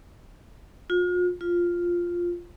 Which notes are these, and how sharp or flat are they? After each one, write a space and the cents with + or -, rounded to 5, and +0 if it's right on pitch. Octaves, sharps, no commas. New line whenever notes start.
F4 +40
F4 +0